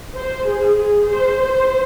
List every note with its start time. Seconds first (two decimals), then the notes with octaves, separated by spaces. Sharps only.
0.17 C5
0.47 G#4
0.78 G#4
1.08 C5
1.40 C5